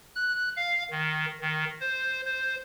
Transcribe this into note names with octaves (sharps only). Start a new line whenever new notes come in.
F#6
F5
D#3
D#3
C5
C5